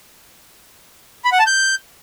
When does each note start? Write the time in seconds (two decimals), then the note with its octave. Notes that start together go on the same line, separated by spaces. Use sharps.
1.25 B5
1.32 F#5
1.39 A5
1.47 G6